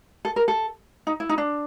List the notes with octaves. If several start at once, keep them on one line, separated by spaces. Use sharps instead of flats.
A4
A#4
A4
D#4
E4
D#4
D4